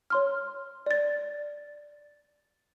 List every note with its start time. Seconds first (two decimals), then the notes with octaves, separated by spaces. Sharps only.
0.10 C#5 C6 F6
0.86 D5 A6